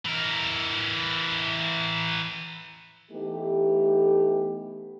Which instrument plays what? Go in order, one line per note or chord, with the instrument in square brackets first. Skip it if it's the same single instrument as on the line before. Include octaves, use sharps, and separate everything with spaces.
[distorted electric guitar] E3 A#4
[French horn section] E3 A3 B3 D#4 G4